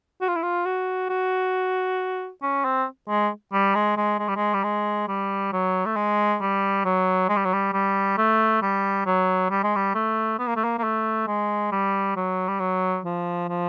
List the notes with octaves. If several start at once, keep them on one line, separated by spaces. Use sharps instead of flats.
F#4
F4
E4
F4
F#4
F#4
C#4
C4
G#3
G3
G#3
G#3
G#3
G3
G#3
G3
G#3
G3
F#3
A3
G#3
G3
F#3
G#3
G3
F#3
G3
G3
A3
G3
F#3
G3
G#3
G3
A3
B3
A#3
A3
A#3
A#3
A3
G#3
G3
F#3
G3
F#3
F3
F3